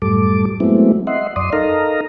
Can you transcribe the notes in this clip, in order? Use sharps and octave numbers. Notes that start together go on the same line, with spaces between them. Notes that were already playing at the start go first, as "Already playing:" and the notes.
F#2 A2 G3 A4 D6
F#3 G#3 A3 B3 C4 E4
D#5 E5 F#5 C6
F#2 D5 C6 D#6
D#4 A4 A#4 D#5 F5 A#5